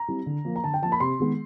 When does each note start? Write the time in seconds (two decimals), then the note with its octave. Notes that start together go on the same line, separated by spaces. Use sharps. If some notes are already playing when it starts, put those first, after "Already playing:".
Already playing: A#5
0.08 G3 C4 E4
0.26 D3
0.45 F3 A#3
0.56 A#5
0.64 D3 A5
0.74 G5
0.82 F3 A#3 A5
0.92 B5
1.00 C3 C6
1.20 D#3 G#3 B3